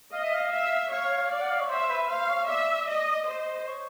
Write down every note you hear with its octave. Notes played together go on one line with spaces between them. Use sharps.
D#5 F5
E5
F5
E5
C#5 F5
F5
F5
D5 F5
F#5
F5
C#5
C5 E5
B4
C5 F5
C#5
D5 E5
D#5
C5 D#5
C#5